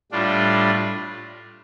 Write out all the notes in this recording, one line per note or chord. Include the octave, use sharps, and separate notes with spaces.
A2 G3 D4 F4